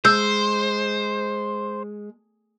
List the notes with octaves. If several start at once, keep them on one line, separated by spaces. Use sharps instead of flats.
G#3 C5 E6 G6